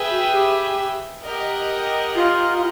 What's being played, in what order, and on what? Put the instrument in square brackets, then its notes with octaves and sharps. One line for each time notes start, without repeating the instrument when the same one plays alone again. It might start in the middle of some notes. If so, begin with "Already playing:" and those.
Already playing: [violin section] G#4 B4 E5 G5
[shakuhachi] F#4
G4
[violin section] G4 A#4 D#5 F#5
[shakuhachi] F4